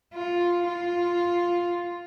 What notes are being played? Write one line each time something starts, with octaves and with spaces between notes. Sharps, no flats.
F4
F4